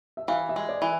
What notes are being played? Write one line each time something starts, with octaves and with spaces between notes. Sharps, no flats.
E5
E3 F5
E5
G#3
D5
E3